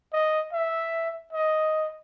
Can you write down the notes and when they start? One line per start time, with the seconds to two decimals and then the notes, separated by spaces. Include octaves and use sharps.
0.13 D#5
0.53 E5
1.33 D#5